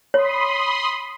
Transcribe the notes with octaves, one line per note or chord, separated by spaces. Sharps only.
C#5 B5 C6 D#6